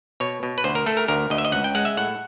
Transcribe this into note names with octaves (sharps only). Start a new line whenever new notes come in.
B2 C#5
B2
B4
D2 C5
A#4
A3 A4
A#4
D2 A#4
D2 D#5
E5
D#5
C#2 F#5
G5
G#3 F#5
E5
A2 F#5